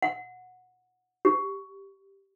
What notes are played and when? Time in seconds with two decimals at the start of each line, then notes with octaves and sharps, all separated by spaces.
0.02 F#5
1.25 G4